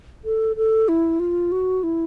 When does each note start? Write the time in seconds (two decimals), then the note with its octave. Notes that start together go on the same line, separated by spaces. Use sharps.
0.25 A4
0.56 A4
0.88 E4
1.19 F4
1.52 F#4
1.83 E4